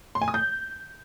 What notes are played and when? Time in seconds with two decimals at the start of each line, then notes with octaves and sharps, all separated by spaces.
0.15 C6
0.22 G#5
0.28 D#6
0.34 G6